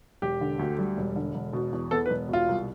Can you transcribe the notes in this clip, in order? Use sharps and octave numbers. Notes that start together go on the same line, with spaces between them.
E1 G4
D3
D2
G3
E1
D3
E1
B2
E2
B3 A4
B4
E1
B2 F4
C2